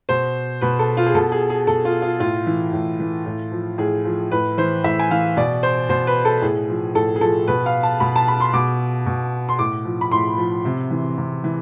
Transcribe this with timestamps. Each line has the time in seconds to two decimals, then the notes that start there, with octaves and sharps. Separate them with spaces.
0.09 B2 C5
0.61 B2 B4
0.79 A4
0.97 F4
1.06 G#4
1.14 B2 A4
1.32 G#4
1.50 G#4
1.67 B2 A4
1.85 F4
2.02 F4
2.20 A2 F4
2.47 E3
2.73 A2
3.00 E3
3.26 A2
3.52 F3
3.78 A2 G#4
4.05 F3
4.31 A2 B4
4.58 E3 C5
4.84 A2 E5
4.99 G#5
5.10 E3 F5
5.37 B2 D5
5.63 C5
5.89 B2 C5
6.07 B4
6.25 A4
6.42 A2 G#4
6.69 F3
6.95 A2 A4
7.16 G#4
7.21 F3 A4
7.47 B2 B4
7.66 F5
7.83 A5
8.00 B2 B5
8.16 A5
8.28 B5
8.40 C6
8.53 B2 D6
9.06 B2
9.49 C6
9.59 A2 D6
9.85 F3
10.01 B5
10.11 A2 C6
10.38 F3
10.65 C3
10.91 E3
11.18 C3
11.44 E3